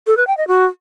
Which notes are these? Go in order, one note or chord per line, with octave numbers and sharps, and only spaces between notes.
A4
B4
G5
D#5
F#4